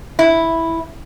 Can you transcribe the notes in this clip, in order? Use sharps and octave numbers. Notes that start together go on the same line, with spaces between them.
E4